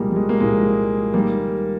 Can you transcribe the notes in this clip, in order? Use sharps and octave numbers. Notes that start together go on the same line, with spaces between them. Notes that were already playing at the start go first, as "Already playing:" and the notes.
Already playing: C2 A#2 F3 G3 G#3 A#3
G3
G#3
A#3
C2 A#2 F3 G#3
D#3 G3 A#3